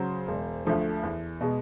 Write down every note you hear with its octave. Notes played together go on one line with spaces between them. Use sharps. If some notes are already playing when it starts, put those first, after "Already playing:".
Already playing: C#3 F#3 C5
E1
D2 D3 F3 A3
E2
B2 G#3